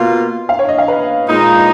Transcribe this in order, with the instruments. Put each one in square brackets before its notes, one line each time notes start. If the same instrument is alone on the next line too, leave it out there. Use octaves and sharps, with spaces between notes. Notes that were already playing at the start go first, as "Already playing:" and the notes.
Already playing: [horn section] B2 A#3 F4
[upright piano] F5
C#5
D#5
F5
B4
[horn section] A#2 G#3 D#4